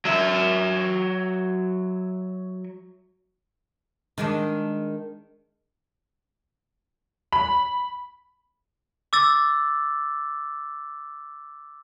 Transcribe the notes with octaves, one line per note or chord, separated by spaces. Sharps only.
F#3 E5
D#3 G#3 D4
B5
D6 E6 A6